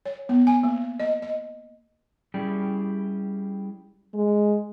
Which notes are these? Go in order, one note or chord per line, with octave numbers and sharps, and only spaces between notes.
C#5
B3
G#5
A#3
D#5
D#5
G3 C#4 E4 G4 G#4 D5
G#3